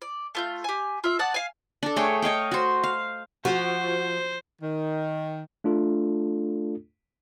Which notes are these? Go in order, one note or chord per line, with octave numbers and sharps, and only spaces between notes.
D5
A3 F4 G6
G4 G#5
F4 E5
D5 F#5 A5 D#6
F5 G#5
D4 A4
A3 G#4 C#5 G5
C#5 D#5 F5 G5
F#4 C5
F5
F3 F#4 C5
D#3
A3 D4 F4 A4